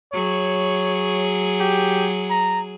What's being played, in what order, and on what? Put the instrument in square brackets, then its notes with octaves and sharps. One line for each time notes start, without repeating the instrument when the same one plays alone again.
[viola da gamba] F#3 G#4 [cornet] C#5
[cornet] G4
A#5